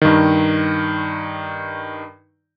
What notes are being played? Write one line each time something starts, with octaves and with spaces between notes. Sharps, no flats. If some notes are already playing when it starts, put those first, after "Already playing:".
G2 D#3